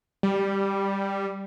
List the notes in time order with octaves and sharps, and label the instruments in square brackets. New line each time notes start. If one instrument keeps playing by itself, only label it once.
[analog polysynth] G3